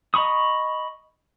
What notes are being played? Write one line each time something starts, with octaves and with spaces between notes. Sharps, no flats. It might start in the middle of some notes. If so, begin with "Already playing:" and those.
D#5 A#5 B5 C#6 D#6